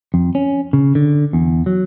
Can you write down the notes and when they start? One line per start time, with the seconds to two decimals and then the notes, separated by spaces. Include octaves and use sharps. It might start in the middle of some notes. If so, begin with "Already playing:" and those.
0.14 F2
0.35 C#4
0.73 C#3
0.95 D3
1.33 E2
1.66 F#3